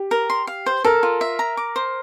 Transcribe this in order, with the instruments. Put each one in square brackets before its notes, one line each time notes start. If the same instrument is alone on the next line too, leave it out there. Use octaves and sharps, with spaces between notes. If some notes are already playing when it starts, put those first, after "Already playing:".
Already playing: [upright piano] G4
[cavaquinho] A#4
C6
F5
C5
[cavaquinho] A4 [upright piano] A#4
[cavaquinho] F4
E5
A#5
D6
C5